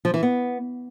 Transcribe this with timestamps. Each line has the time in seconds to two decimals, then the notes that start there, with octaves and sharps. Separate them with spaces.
0.05 F3
0.14 E3
0.23 B3